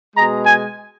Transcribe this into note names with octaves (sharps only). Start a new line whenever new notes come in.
B2 G#3 A#5
G#5